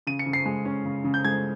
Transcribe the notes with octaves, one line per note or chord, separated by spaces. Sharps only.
C#3 D#7
C#7
C#3
C7
G#3
C#4
C#3
C#3
G6
G#3 G#6